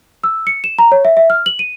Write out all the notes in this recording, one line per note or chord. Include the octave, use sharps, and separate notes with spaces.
E6
C#7
E7
A#5
C#5
E5
E5
F6
F#7
D#7